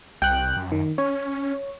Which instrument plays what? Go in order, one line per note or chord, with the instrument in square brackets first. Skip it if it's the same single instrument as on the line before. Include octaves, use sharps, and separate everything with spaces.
[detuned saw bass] C2 [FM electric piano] G5 F#6
[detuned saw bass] F#2
[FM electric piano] D#3
[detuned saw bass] C#4 [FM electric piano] C#5